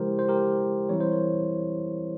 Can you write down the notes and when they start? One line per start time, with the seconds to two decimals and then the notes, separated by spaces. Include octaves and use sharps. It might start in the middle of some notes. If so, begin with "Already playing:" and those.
Already playing: C#3 F3 G#3 E4 G4 A#4 C5
0.19 C5
0.29 G4 A#4
0.89 E3 G3 C4 E4 C#5
1.01 C5
1.12 A#4 C#5